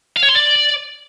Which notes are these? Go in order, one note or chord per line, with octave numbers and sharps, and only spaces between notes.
F5
C#5
C6
D5